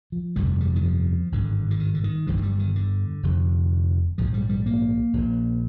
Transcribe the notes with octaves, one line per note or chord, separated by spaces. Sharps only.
F3
G1 F2 C3 G3
G3
D#3
F3
G#1 G2 D3
D3
D#3
D3
D#3
G1 G2 D3 F3
F3
G3
D#3
D3
F1 F2 D3
A#1 G#2 F3
G3
G3
A#3
A#1 A#2